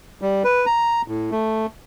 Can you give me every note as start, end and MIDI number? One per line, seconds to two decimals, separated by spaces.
0.22 0.43 55
0.44 0.66 71
0.66 1.02 82
1.08 1.30 45
1.32 1.66 57